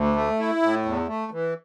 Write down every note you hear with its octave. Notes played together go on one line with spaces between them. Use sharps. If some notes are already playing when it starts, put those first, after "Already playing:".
Already playing: D2
A3
E4
A2
E2
A3
E3